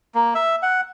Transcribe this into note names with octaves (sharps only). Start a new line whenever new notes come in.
A#3
E5
F#5